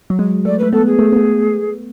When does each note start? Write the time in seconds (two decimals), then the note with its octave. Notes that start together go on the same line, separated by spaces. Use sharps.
0.10 F#3
0.19 G#3
0.45 A3 D5
0.58 A3 B4
0.72 B3 A4
0.86 G#4
0.99 A3
1.12 B3
1.16 A3